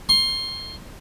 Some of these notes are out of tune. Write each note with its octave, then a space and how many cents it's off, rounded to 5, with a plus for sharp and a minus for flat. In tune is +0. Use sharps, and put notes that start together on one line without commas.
C6 +25